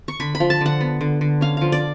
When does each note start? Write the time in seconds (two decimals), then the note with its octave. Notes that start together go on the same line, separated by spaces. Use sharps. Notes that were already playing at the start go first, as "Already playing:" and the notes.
0.08 C#6
0.20 D3 B5
0.35 B5
0.40 F3
0.50 A5
0.61 D3 F#5
0.81 B3
1.01 D3
1.21 D3
1.41 C#4 F5
1.57 F3 F5
1.72 D5